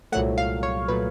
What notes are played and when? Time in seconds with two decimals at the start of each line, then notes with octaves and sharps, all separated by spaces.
0.12 C2 A#2 F#3 A3 F#5
0.38 F5
0.63 C#5
0.88 A#2 F#3 A3 B4